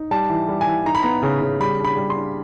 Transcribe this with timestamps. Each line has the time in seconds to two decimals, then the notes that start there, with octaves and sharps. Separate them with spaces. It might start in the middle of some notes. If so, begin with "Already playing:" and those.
Already playing: D#4
0.11 G3 A5
0.30 E3
0.48 G3
0.61 G#5
0.67 E3
0.85 D#4 A#5
0.95 B5
1.03 B3 A#5
1.23 C#3
1.41 C#3
1.60 G3 B5
1.79 D4
1.85 B5
1.97 G3
2.10 C6
2.16 D4